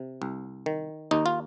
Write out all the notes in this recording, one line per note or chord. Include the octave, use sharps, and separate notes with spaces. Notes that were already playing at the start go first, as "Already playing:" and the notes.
Already playing: C3
C2
D#3
D#2 D#4
F4